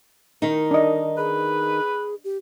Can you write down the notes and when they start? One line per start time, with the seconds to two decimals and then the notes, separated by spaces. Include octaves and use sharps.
0.42 D#3 D#4 A#4
0.71 D4 D#5
1.17 G#4 B4
2.24 G4